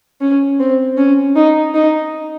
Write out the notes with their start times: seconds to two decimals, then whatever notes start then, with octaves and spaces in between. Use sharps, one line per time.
0.21 C#4
0.59 C4
0.98 C#4
1.36 D#4
1.74 D#4